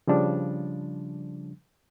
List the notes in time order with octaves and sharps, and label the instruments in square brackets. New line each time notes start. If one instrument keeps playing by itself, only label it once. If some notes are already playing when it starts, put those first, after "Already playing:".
[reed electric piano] C#3 F3 G3 D4